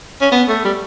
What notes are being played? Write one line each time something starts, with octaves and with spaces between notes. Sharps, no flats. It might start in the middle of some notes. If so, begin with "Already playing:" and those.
C#4
B3
A3
G3